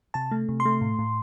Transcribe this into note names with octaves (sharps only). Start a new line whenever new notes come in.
C3 A5
A3
C3
C6
A3
A2
A2